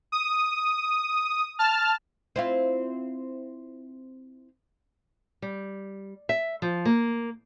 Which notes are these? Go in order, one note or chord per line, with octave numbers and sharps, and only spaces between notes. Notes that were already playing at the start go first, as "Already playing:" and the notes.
D#6
A5 F6
C4 E4 F4
G3
E5
F3
A#3